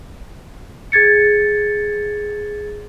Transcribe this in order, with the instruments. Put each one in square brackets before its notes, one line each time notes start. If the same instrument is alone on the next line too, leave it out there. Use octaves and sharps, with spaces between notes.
[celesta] G#4 G#6 A6 C#7